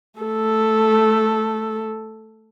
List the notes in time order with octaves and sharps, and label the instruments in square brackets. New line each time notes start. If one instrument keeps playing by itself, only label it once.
[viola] A3 A4